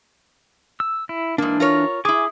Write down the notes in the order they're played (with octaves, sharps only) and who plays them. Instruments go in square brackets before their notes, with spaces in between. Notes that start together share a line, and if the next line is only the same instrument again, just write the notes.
[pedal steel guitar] E6
E4
[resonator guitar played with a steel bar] G#2 A#3 [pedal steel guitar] E3 D4
[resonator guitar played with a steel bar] F4 A#4 C#5
[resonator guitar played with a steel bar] E4 G#4 [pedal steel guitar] G#5 D6